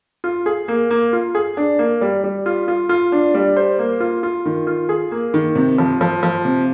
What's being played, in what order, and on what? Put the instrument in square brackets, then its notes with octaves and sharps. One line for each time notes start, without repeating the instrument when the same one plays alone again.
[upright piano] F4
G#4
A#3
A#3
F4
G#4
D4
A#3
G3
G3
F4
F4
F4
D4
G3
C5
A#3
F4
F4
D#3
F4
G#4
A#3
D#3
C3
F3
F3
F3
C3